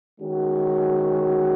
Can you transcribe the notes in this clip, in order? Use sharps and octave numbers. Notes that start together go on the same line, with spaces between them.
D#3 G#3 C#4 F#4